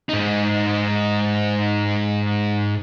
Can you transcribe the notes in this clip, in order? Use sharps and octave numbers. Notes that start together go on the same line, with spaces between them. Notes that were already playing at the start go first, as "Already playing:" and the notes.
G#2 D#4